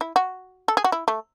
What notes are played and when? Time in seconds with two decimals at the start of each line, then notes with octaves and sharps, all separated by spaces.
0.01 E4
0.16 F#4
0.68 A4
0.77 G#4
0.84 F#4
0.92 E4
1.08 A3